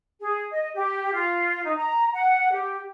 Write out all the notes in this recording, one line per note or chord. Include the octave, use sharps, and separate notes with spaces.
G#4
D#5
G4
F4
D#4
A#5
F#5
G4